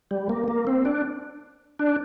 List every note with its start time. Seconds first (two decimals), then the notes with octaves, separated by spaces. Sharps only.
0.11 G3
0.29 A#3
0.48 A#3
0.67 C4
0.85 D4
1.79 D4